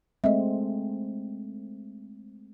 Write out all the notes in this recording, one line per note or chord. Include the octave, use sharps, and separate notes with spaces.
G#3 A3 C4 D#5 E5